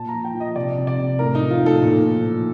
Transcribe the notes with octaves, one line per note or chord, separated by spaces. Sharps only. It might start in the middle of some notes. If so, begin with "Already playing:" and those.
Already playing: A#2 A5
A#5
F3
G5
F3
D#5
C3 D5
C3
D5
C3
A2 A#4
D#4
F3
F4
A2 A4
A#2
F3
F3